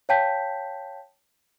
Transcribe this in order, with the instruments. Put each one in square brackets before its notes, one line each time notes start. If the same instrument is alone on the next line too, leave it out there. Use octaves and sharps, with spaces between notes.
[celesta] C#5 F5 G5 A5 G6 B6